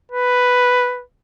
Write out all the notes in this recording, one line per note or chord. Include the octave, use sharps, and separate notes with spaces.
B4